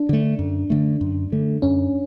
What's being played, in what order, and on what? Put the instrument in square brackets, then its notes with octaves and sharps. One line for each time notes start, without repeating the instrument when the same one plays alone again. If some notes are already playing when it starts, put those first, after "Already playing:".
Already playing: [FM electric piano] D4
[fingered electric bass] D3 A3
F#2
D3 A3
F#2
D3 A3
[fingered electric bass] F#2 [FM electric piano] C#4